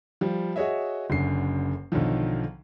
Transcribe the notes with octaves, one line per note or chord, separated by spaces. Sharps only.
F3 G3
F#4 G#4 C#5 D#5 E5
F#1 F#2 D3 C7
B1 D3 D#3 F3